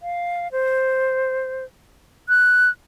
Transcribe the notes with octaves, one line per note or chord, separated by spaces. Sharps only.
F5
C5
F#6